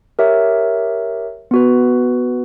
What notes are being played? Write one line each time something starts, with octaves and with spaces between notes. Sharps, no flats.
G4 A#4 C#5 E5
B3 F#4 B4